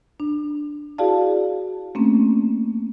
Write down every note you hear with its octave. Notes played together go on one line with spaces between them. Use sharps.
D4
E4 F#4 G#4 D5 F5 A5
A3 A#3 C4 C#4